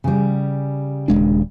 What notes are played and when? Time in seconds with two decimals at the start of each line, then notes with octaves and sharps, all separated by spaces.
0.04 C#3 G3
1.08 D#1 G#3 D4